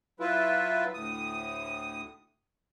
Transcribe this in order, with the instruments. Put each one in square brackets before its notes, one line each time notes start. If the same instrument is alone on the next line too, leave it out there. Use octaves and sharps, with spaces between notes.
[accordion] F#3 E4 F4 B4
D2 A2 D#6